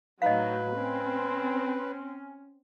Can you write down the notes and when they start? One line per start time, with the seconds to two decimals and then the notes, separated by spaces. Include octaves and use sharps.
0.22 A2 F#3 D#4 B4 D#5 F5
0.76 C4 C#4